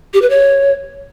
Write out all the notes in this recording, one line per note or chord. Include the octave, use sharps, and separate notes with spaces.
G4
B4
C#5